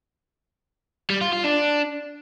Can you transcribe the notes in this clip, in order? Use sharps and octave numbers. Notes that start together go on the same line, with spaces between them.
G3
F4
F4
D4